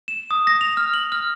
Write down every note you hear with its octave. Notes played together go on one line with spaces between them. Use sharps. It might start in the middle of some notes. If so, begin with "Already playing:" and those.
E7
D#6
A#6
F7
F6
F#7
F6